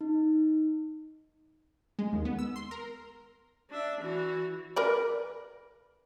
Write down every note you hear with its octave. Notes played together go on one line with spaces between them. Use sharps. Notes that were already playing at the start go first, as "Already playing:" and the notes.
D#4
G#3
D#2
B3
E6
C6
A#4
D4 E5
E3 F#4
A#4 B4 D5